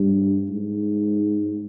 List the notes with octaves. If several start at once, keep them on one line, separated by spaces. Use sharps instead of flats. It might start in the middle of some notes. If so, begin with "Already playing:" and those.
Already playing: G2
G#2